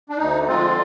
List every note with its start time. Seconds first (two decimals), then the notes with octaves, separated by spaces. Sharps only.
0.09 D4
0.18 D2 D#4
0.47 D3 F3 G#3 C4 F4